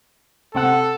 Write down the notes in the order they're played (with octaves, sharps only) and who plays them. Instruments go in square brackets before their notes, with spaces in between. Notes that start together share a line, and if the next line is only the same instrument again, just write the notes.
[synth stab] C3 C4 F#5 [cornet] A4